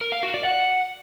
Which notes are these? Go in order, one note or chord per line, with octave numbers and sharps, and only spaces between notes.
A#4
F5
F#4
D5
F#5